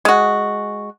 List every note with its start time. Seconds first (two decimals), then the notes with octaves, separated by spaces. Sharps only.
0.05 G#3 F#4